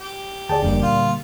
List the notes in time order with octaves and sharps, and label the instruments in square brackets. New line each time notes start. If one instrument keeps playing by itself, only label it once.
[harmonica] G4
[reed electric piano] D2 D5 [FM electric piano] G#4 G5 A5
[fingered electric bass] F1 F2 [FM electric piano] D3 G3 A#3
[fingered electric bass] A#2 [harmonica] F4